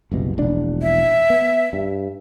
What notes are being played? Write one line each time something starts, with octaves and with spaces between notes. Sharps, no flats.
F#1 C2 B2
E1 A#1 D4
E5
B3
G2